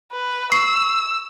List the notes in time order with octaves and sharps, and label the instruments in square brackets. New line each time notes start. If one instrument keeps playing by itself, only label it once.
[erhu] B4
[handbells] C#6 [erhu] E6 [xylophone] C7